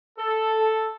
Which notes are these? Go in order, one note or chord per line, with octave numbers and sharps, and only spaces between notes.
A4